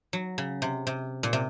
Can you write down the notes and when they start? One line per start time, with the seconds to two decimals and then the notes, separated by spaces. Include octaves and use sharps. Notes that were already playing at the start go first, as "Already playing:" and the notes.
0.13 F#3
0.38 C#3
0.62 C3
0.87 C3
1.23 A#2
1.33 C3